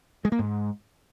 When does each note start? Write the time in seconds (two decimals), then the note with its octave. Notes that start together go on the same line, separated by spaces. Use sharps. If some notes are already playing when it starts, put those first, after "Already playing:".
0.25 G#3
0.32 A#3
0.39 G#2